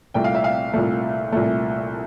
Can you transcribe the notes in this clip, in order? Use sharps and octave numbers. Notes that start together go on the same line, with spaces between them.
C2 A#2 A3 G5
F5
E5
F5
C2 A#2 A3
C2 A#2 A3